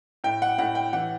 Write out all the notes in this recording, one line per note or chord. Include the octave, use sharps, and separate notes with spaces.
A2 G5
F#5
A2 F#5
G5
E3 F#5